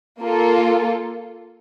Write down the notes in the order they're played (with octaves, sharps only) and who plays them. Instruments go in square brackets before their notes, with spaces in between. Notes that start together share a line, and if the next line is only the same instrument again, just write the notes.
[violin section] A#3 F4 A4